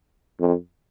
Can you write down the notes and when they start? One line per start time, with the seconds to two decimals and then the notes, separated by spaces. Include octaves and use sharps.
0.39 F2